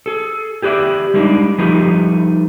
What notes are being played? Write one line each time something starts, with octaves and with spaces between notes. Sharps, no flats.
G#4 A4
G4 G#4 B4 D5 E5
G3 G#3 A#3 D4 D#4
F3 G3 A3 D#4 G#4 B4